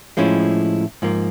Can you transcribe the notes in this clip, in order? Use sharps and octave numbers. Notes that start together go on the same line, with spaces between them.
A2 F3 G#3 C#4 E4
G#2 F3 A#3